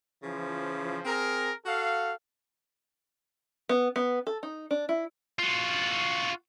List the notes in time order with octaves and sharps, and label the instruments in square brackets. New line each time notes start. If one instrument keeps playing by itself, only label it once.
[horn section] C#3 E3 F3
C4 G#4 A#4
F#4 A4 F5
[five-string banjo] B3
B3
A4
D#4
D4
E4
[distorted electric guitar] F4 F#4